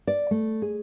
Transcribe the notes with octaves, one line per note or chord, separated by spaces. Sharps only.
D5
A3
G#4